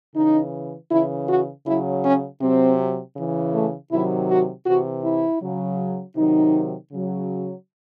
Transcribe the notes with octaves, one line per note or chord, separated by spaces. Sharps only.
C#3 E3 D#4
C#3 E3 E4
F#4
C#3 F#3 E4
C#4
C3 F#3 C4
C#3 E3
A3
C3 D#3 F#3 E4
F#4
C3 E3 F#4
E4
C#3 F#3
C3 D#3 F#3 D#4
C#3 F#3